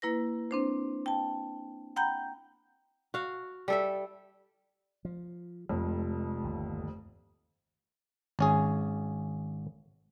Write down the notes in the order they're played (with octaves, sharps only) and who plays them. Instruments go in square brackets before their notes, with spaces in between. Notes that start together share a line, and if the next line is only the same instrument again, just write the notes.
[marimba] A#3 E4 B4 A#6
C4 D4 C5
G5 A5
F#5 G5 A#5 B5 G6
[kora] F#4 F5
G3 A4 E5
[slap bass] F3
[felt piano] F1 F2 [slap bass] C3 G#3
[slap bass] G1 D#2
[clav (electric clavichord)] G#1 C#4 G#4